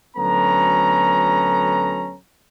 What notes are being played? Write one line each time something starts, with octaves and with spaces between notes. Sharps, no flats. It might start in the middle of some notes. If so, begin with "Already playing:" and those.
D2 F#3 B3 C#4 A4 A#5